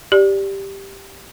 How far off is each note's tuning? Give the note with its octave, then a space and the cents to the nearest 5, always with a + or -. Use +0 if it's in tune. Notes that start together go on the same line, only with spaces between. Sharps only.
G4 +0 D5 +0